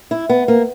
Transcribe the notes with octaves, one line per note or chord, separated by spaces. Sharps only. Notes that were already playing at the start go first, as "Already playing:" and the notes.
E4
B3
A#3